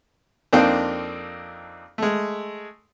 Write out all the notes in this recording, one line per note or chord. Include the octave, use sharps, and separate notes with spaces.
F2 A#3 C4 D4 D#4 G5
G#3 A3